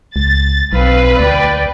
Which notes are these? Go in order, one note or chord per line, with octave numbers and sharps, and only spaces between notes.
C#2 A6
B1 C4 B4 F5
D2 D5 G5